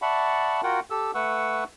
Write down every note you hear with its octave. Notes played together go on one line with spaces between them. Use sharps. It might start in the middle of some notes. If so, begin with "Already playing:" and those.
D5 E5 F#5 A5 B5 C#6
F4 F#4 A#4 F#5 G5
G4 A4 E6
A3 B4 F#5 C#6 E6